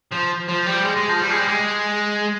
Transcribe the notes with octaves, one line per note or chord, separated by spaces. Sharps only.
F3
F3
G3
G#3
G#3
F3
G3
G#3
G3
G#3